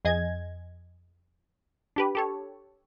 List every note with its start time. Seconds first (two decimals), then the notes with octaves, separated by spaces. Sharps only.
0.05 F2 G#4 D#5 G#6
1.96 D4 G4 B4
2.15 G4 A4 C#5